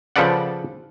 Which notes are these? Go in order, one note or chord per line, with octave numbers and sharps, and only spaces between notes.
C#3 F3 A4 B4 D5 F#5